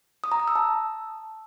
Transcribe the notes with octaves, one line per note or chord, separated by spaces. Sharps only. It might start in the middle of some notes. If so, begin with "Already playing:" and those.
D#6
A#5
D#6
E6
A5